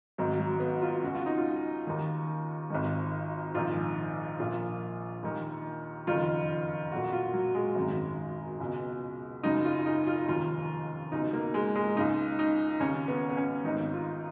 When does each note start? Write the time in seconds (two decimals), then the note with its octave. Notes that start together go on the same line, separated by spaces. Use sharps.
0.18 G#1 G#2 D#3 F#3
0.39 F#3
0.60 B3
0.82 F4
1.02 C#2 C#3 F#4
1.15 F4
1.26 D#4
1.38 F4
1.87 D#2 D#3
2.70 G#1 G#2 D#3
3.54 A#1 G#2 D#3 F4
4.39 A#1 A#2 F4
5.23 D#2 D#3
6.07 F#1 F2 D#3 F4
6.91 B1 A#2 F#4
7.13 F4
7.34 F#3
7.55 G#3
7.75 G#1 F#2 D#3
8.60 C#2 B2
9.43 F#1 F#2 C#3 D#4
9.65 F4
9.86 D#4
10.07 F4
10.28 F1 D#2 D#3 F4
11.12 C#2 B2 D#4
11.33 A#3
11.54 G#3
11.75 G#3
11.96 C#2 C#3 D#4
12.39 D#4
12.80 D#2 C#3 C#4
13.08 B3
13.29 B3
13.37 C#4
13.64 G#1 G#2 D#3 D#4
13.93 F4